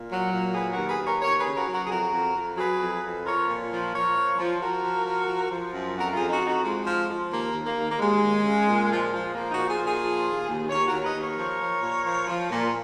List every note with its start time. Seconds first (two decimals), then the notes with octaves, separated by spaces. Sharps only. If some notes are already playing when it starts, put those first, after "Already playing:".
Already playing: A#2
0.09 F#3
0.32 A#2
0.54 F#3 G#4 B4
0.71 F#4 A#4
0.76 D#2
0.87 G#4 B4
0.99 D#2
1.05 A#4 C#5
1.21 D#2 A#4 C#5
1.38 G#4 B4
1.44 C#3
1.55 F#4 A#4
1.67 F#3
1.73 F#4 A#4
1.84 G#4
1.89 F2 F#4 A#4
2.13 F2
2.35 F2
2.57 F#3 G#4 B4
2.80 F2
3.02 F2
3.25 F3 A#4 C#5
3.48 A#2
3.70 F3
3.92 F3 A#4 C#5
4.15 F3
4.37 F3
4.60 F3 F#4 A#4
4.83 F3
5.05 F3
5.28 F3
5.50 F3
5.73 F#2
5.96 F2 F#4 A#4
6.12 F4 G#4
6.18 F2
6.29 D#4 F#4
6.41 F2
6.47 D#4 F#4
6.63 F3 G#3
6.86 F3
7.08 F3
7.30 D#2 A#3
7.54 D#2
7.64 A#3
7.76 D#2
7.89 A#3
7.99 D#2 G#3
8.21 D#2
8.44 C#3
8.66 A#2
8.89 F3
9.11 F3
9.34 F3 A#3
9.50 D#4 F#4
9.56 A#2
9.68 F4 G#4
9.79 A#2
9.84 F4 G#4
10.02 F3
10.25 D#2
10.47 D#2
10.69 D#2 A#4 C#5
10.86 F#4 A#4
10.91 D#2
11.03 B4 D#5
11.15 D#2
11.20 A#4 C#5
11.36 F3
11.59 F3
11.82 A#2
12.04 F3
12.27 F3
12.50 A#2